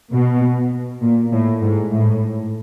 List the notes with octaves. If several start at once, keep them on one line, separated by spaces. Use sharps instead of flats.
B2
A#2
A2
G#2
A2